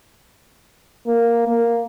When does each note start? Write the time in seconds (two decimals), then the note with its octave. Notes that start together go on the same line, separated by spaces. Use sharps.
1.07 A#3
1.47 A#3